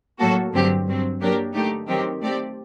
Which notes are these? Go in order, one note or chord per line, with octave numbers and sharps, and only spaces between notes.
A2 F#3 A#3 F#4 A4
G2 D3 F#3 C4 G4
G2 F#3 C4
F#3 A#3 D4 G4 A#4
D3 A3 D#4 G4
D#3 F#3 C4 G4 A#4
A3 C4 G4 D5